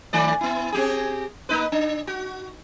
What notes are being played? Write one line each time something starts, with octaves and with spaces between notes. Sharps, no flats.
D#3 A3 D5
B3 E4
C4 G4 G#4
A#3 D#4 B4
D4
F#4